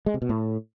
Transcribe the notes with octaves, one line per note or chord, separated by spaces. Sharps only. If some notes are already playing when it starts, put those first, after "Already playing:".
G#3
C3
B2
A2